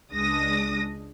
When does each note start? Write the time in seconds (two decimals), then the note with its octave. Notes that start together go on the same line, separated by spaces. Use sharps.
0.13 C#2 G#3 D4 D#6 A#6